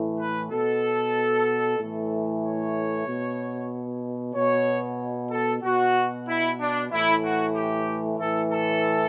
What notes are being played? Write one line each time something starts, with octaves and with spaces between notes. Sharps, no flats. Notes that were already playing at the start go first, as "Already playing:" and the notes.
Already playing: A2 E3
B4
B2 A4
A2 E3
C#5
B2
B2 C#5
A4
B2 F#4
E4
D4
A2 E3 E4
F#4
G4
A2 E3 A4
A4